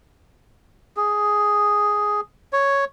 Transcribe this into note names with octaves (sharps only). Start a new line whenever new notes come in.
G#4
C#5